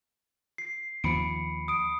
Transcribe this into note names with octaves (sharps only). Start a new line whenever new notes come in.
C7
D#2 F3 B5 C#7 D7
D#6 D7